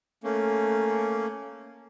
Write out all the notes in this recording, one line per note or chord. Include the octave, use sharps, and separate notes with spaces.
A3 A#3 C#4